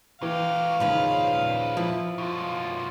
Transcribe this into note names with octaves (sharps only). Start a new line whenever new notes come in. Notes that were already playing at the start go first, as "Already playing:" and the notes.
E3 F#3 G4 F5
D#2 A#2 C#3 F3 B4
F3 E4
F#2 B2 F4